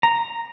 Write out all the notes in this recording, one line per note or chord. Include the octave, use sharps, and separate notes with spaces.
A#5